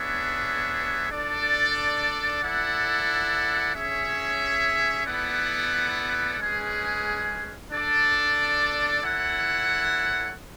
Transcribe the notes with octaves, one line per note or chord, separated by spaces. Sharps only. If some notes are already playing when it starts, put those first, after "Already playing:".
Already playing: B3 D4 G#4 C#5 E5
D4 A4 D5
E4 A4 D5 F#5
C#4 G#4 C#5 E5
B3 E4 A4 D5 F#5
G#3 C#4 G#4 B4
D4 A4 D5
E4 A4 C#5 F#5